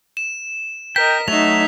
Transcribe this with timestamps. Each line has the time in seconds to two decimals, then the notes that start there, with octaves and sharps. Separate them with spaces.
0.17 E7
0.96 A#4 D#5 G5 B6
1.28 F#3 A3 D#4 F#4 E5 F7